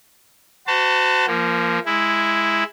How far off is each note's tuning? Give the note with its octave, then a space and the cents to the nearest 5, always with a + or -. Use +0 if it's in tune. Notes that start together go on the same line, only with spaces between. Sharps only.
F#4 +10 C5 -35 A5 +25
F3 -20 A#3 +0
G#3 +0 E4 +0